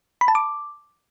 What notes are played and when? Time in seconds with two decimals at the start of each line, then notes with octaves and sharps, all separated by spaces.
0.21 B5
0.28 A5
0.35 D6